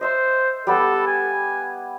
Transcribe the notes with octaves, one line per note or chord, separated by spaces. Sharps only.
C5 D#5 E5 C6
G3 B3 A4 B5
G#5